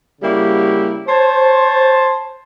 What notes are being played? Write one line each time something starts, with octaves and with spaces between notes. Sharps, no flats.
C#3 G3 A#3 E4 F#4 G4
C5 C#5 A5